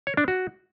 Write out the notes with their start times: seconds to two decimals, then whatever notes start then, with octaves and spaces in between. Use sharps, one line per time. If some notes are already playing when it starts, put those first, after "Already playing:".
0.07 C#5
0.17 D4
0.28 F#4